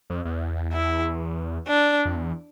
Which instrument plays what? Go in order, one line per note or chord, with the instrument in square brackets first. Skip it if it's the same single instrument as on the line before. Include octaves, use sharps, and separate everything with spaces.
[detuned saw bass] F2
E2
[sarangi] E4
D4
[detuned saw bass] F2
E2